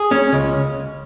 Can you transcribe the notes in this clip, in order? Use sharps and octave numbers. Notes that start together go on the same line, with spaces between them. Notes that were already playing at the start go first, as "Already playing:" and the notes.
Already playing: G#4
C#4
C#2